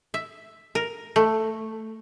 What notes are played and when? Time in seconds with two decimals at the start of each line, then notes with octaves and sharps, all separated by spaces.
0.14 E5
0.75 A#4
1.16 A3